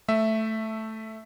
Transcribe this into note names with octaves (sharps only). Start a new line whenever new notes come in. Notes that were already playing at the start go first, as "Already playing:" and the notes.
A3 E5